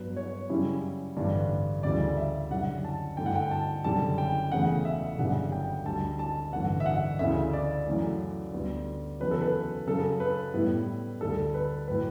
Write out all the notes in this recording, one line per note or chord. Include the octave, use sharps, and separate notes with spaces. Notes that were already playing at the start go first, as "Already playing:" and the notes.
Already playing: G2 F#3 B3 B4
C#5
F#2 C#3 G3 C#4 E4
A1 G2 D3 G3 D4
D2 C#3 E3 G3 D5
E5
F#1 F#2 D3 G3 D4 F#5
A5
G2 D3 A3 E4 G5
F#5
G5
A5
F#1 F#2 D3 G3 D4 A5
G5
E1 E2 C#3 E3 A3 F#5
E5
G1 F#2 C#3 G3 D4 F#5
G5
D2 D3 G3 D4 A5
A5
A1 G2 D3 F#5
E5
F#5
D2 C#3 E3 E5
D5
F#2 C#3 E3 A3
D2 D3 G3 B3
E2 C#3 F#3 C#4 B4
A4
B4
F#2 C#3 F#3 A4
B4
A2 G3 B3 E4
D2 D3 G3 D4 A4
B4
A2 F#3 B4